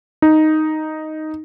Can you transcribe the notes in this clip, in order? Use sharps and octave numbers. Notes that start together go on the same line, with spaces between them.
D#4